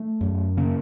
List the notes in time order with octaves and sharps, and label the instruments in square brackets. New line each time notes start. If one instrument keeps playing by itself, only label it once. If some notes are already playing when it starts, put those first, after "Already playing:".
Already playing: [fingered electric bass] A3
F#2
C#3 A#3